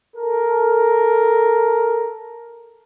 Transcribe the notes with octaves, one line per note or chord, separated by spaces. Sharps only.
A4 A#4